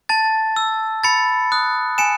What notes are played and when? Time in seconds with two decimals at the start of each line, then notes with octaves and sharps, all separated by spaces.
0.09 A5 A6
0.56 E6
1.04 B5 A6 C#7
1.52 D#6 F#6
1.98 G#5 C#7 E7